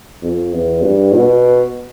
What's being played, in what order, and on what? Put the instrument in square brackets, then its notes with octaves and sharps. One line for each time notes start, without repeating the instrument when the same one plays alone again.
[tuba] F2
E2
G2
B2